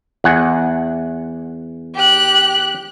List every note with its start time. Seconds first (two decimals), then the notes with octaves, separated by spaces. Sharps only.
0.24 E2 F#5 G#5
1.95 G4 F#6